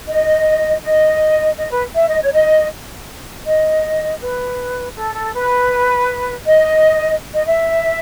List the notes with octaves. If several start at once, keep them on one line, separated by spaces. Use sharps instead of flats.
D#5
D#5
D#5
B4
E5
D#5
C#5
D#5
D#5
B4
A4
A4
B4
D#5
D#5
E5